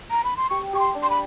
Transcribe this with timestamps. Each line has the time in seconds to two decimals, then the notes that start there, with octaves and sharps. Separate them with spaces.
0.11 A#5
0.24 B5
0.37 C6
0.50 G4 C#6
0.73 G4 C#6
0.80 C6
0.95 D4
1.03 C6
1.10 B5